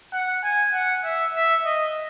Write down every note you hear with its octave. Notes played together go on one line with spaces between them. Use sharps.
F#5
G#5
F#5
E5
E5
D#5